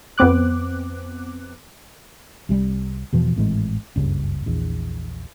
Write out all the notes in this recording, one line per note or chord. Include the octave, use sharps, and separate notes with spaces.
F2 B3 C4 D6 F#6
C2 C3 G3
E2 B2 E3 F3
G#1 A2 E3 G#3
F#1 C#2 G2 C#3
A#1 E2